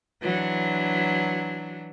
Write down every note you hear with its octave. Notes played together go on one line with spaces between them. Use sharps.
E3 F#3 D4